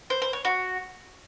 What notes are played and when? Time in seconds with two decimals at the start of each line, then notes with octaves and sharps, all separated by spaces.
0.10 C5
0.22 C5
0.33 C#5
0.45 F#4